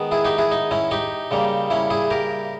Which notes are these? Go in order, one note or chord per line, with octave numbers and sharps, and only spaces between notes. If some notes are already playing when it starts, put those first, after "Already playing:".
Already playing: D#3 G#3 B3
E4 G#4
D#4 G4
E4 G#4
D#4
C#4 E4
D#4 G4
C#3 G3 A#3
C#4 E4
E4 G#4
G4 A#4